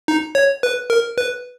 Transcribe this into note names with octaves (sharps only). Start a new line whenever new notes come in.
D#4
C#5
B4
A#4
B4